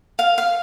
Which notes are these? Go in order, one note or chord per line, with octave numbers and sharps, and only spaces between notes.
F5
F5